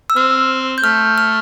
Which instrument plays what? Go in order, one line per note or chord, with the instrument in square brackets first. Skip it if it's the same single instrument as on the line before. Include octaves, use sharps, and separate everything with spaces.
[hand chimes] E6
[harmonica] C4 [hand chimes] F6
[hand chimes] G6
[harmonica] A3 [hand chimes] F6
[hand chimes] F6